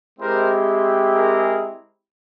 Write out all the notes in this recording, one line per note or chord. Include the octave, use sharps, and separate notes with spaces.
G#3 C4 E4 G4 A#4 C5
G#4 A#4